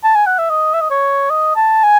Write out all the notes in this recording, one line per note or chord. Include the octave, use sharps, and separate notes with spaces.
A5
G#5
F#5
E5
D#5
E5
D#5
C#5
D#5
A5
G#5